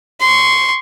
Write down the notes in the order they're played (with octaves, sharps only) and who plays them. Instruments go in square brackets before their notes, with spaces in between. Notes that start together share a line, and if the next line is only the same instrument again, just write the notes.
[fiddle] C6 C#6